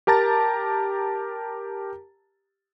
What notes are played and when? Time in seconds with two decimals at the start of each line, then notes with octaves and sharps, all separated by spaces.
0.07 G4 A#4 A5 A#5 A6